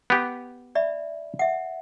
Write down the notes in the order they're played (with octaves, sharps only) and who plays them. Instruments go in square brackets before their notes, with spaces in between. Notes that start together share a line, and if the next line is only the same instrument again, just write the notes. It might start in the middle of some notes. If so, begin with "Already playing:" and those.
[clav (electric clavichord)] B3 G4
[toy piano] D5 E5 B5
E5 F#5